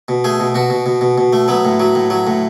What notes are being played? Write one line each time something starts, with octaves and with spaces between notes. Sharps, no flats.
B2
A3 G#4
B2
B2 F#4
B2
B2
B2
B2
A3
F#3 B3
A2
F#3
A2
F#3
A2